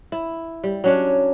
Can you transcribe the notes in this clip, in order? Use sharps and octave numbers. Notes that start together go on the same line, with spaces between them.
E4
G3
F#3 C#4 D4